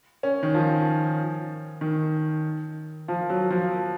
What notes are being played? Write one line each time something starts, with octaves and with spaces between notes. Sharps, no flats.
C#4
D#3
F3
D#3
F3
F#3
F3